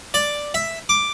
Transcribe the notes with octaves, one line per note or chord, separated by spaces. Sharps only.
D5
E5
D6